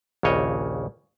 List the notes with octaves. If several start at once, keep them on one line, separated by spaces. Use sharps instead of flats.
A#1 D#2 C#3 C#5 D#5